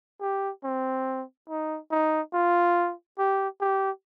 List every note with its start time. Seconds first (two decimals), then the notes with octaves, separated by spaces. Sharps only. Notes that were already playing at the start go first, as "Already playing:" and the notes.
0.21 G4
0.64 C4
1.49 D#4
1.91 D#4
2.34 F4
3.18 G4
3.61 G4